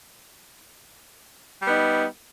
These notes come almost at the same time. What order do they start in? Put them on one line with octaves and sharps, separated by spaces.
G3 B3 D#4